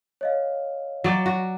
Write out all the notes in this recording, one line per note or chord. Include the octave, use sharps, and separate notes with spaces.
C#5 D#5 F5
F#3 D5 G5
F#4